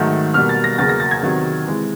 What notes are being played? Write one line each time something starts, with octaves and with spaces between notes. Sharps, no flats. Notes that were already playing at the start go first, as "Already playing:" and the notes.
Already playing: G#2 D#3 F#3 A3
B2 G3 A#3 F6
A6
A#6
E2 C#3 F#3 A#3 A6
A#6
A6
G#6
E2 C3 D#3 F#3
C3 E3 G#3